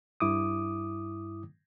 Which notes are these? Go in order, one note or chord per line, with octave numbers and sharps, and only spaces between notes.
G2 E4 D6 D#6